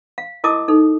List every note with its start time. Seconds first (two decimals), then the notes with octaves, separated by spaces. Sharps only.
0.18 F5
0.44 E4 A#4 D#5 A5 D6 D#6
0.68 D#4 A4